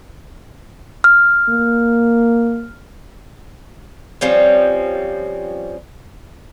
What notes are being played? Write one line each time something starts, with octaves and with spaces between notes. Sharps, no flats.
F6
A#3
F3 G3 C4 C#4